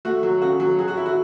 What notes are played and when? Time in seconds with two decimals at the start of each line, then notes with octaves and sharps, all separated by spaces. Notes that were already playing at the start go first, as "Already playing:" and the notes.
0.05 A3 F#4
0.23 F#3
0.42 C#3 F#4
0.60 F#3
0.79 F#3 G#4
0.88 F#4
0.97 E4
1.06 F#4